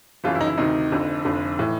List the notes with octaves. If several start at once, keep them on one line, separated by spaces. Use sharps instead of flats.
G1 F#2 C#3 E3 F4
E4
D#4
E4
D2 C3 D#3 D#4
F1 F2 D3
F1 F2 D3
A2 E3